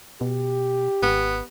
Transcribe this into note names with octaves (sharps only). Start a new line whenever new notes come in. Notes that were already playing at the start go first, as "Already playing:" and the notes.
B2 G4
G#1 B3